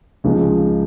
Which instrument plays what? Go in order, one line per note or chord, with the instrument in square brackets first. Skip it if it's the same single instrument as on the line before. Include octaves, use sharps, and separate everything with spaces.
[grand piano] C#2 C#3 F3 G#3